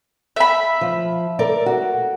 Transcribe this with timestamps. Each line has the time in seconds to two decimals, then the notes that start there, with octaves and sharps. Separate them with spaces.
0.36 E5 B5
0.81 F3
1.39 A4 A#4 D5
1.66 F#4